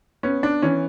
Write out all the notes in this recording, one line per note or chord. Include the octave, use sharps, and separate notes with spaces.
B3 C#4
D4
E3 C#4